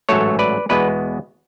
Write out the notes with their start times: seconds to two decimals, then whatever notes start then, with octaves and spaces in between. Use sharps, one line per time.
0.09 A1 G#2 F#3 A3 A4 C#5
0.39 B4 D5
0.69 E2 B2 G#3 B3 B4 D5